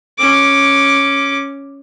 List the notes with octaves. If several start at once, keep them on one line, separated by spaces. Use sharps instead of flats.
C#4 D6